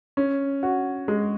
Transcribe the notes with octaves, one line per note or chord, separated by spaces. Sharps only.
C#4
F#4
G#3